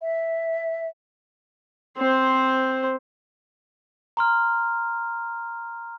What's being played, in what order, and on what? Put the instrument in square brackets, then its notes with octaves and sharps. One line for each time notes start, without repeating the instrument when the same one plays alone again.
[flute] E5
[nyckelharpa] C4 C5
[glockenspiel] A#5 C6 F6